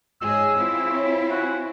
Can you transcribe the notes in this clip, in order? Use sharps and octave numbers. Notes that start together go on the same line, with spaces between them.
G#2 G#3 C#4 G#4 D#5 E6
C4 E4 F4
C5 C#5
F#4 G#5